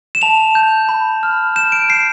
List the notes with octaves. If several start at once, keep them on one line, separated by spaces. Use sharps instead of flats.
E7
A5 F7
G6
B5
F6
G6 E7
D7
G6 C7